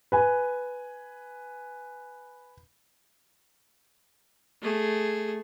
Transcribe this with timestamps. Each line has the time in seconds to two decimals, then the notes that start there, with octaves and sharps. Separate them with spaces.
0.12 B4 G#5
4.62 A3 G#4